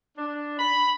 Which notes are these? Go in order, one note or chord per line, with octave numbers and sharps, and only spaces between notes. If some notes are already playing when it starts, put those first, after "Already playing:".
D4
B5